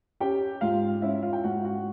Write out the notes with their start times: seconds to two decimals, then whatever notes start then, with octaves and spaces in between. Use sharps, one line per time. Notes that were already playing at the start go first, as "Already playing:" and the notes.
0.20 C#4 G4 G5
0.61 G#2 F4 F5
1.02 C#4 E4 E5
1.23 F4 F5
1.33 G5
1.44 G#2 F#4 F#5
1.64 F#4 F#5